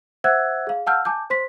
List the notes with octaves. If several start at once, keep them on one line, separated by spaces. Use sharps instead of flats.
C5 E5 F#5 E6 F#6 G#6
G#4 F5
F5 F#5 A5 E6 F6 G6
G#5 A5 D6 G6
C5 C6 B6